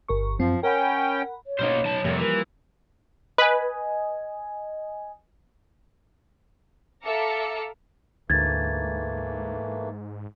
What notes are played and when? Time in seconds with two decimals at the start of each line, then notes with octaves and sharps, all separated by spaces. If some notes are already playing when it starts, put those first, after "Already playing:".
0.08 G1 A#4 C#6
0.39 F#2 F3 C4
0.63 C#4 A#4 F#5 G5 B5
1.46 C#5
1.59 B2 A#3 C#4 D#4 C5
1.85 F#3 A5
2.04 F2 C3 F3 G3 A#3
2.19 E3 A#4
3.38 B4 D#5 G#5
7.03 A4 E5 F5 A#5 D6 C#7
8.30 D2 G#2 E3 A3 A#3 G#6 A6